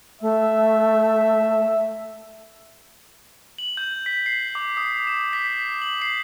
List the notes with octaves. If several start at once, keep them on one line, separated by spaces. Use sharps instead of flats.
A3 E5
F#7
G6
B6
C7
D6
D#6
E7
B6
F#7
C7